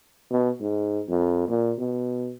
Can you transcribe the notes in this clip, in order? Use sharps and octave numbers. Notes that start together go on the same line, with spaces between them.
B2
G#2
F2
A#2
B2